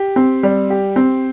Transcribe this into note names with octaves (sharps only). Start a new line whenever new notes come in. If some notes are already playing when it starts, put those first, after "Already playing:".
Already playing: G4
C4
G3
G4
C4